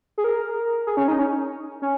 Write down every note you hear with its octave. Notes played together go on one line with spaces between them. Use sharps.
G#4
A#4
G#4
C#4
D#4
C#4
C#4